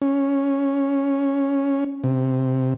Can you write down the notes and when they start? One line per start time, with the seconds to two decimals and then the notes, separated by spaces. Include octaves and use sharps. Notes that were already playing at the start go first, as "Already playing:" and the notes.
0.02 C#4
2.04 C3